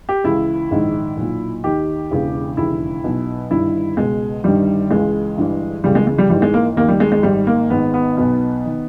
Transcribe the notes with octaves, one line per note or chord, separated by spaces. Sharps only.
G4
C#2 C#3 E3 E4
A#1 G#2 D#3
B1 A#2
D#2 D#3 G4
E1 E2 C#3 E3
E1 D#2 C#3 E3 E4
B1 B2
G1 G2 D#3 E4
C#2 B2 G#3
G1 G2 D#3 G3
C#2 C#3 E3 G#3
G1 G2 E3
C#2 C#3 E3 G3
G#3
G#3
G3
G#1 G#2 E3 G3
G#3
A#3
D#2 D#3 A#3
G3
G#3
G#3
G#1 G#2 D#3 G3
A#3
G#1 G#2 D#3 B3
B3
B1 B2 B3
D#3